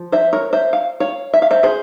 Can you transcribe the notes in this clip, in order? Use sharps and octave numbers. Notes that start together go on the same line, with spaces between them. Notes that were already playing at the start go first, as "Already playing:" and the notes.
Already playing: F3
C5 E5
A#4 C#5
C5 E5
F5
C#5 F5
E5
F5
C5 E5
G#4 C5